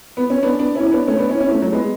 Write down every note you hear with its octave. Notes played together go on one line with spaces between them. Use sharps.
B3
C#4
B3 D4
B3 D4
C#4 E4
C#4
B3 D4
A3 C#4
B3 D4
C#4 E4
C#4 E4
A3 C#4
F#3 A3
G#3 B3